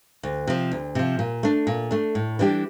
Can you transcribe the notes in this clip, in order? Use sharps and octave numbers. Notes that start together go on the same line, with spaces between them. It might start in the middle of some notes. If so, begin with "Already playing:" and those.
D2
C3 F3
D2
C3 F3
A#2
A3 D4
A#2
A3 D4
A2
E3 G3 D4 G4